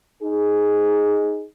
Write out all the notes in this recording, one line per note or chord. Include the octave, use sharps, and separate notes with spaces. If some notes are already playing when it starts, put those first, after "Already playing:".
D#4 G#4